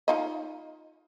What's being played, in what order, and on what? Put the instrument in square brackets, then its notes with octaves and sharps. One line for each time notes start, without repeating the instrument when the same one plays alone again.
[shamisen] D#4 F4 D#5